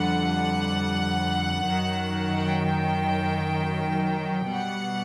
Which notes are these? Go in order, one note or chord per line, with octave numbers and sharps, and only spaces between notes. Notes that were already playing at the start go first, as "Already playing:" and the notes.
Already playing: F2 D3 G3 F#5
F#2 D#3 F#3
G5
B2 G3 F#5